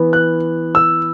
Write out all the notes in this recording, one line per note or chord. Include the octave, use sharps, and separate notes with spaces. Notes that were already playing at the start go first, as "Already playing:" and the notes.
Already playing: E3 B3
F#6
E6